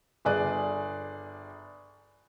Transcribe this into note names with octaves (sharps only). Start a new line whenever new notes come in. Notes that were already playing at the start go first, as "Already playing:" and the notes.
G1 G#4 D5 F#6